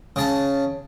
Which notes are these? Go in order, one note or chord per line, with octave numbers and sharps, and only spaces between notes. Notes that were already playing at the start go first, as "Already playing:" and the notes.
C#3 A5